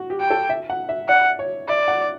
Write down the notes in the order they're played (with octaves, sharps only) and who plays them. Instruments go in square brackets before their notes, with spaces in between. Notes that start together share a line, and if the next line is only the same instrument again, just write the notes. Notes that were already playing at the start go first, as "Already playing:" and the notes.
Already playing: [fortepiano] F#4
G4
[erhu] G5
[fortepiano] A4
E5
F#5
E5
[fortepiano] D5 [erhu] F#5
[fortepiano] C#5
[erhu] D5 [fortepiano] E5
[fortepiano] F#5